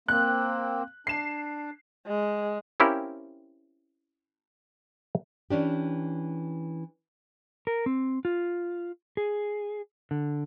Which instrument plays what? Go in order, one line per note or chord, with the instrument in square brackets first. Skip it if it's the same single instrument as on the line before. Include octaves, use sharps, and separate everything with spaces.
[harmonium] A#3 C4 [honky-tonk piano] F#6
[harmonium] D4 [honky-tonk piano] C7 E7
[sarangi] G#3
[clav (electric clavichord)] C4 C#4 E4 G4 A#4 F5
[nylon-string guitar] E3 C#4 D4 G4
[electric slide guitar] A#4
C4
F4
G#4
D3